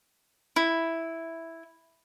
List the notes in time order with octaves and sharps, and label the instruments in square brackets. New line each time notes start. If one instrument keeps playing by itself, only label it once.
[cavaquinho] E4